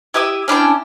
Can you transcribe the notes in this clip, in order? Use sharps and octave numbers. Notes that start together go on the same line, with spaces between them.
E4 G4 E5 D#6
C#4 D4 E4 G5